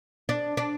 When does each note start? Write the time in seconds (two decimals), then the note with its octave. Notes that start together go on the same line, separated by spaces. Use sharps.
0.29 D4
0.57 D4